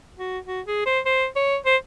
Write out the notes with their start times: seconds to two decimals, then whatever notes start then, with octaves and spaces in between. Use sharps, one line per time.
0.18 F#4
0.47 F#4
0.67 G#4
0.86 C5
1.06 C5
1.36 C#5
1.66 C5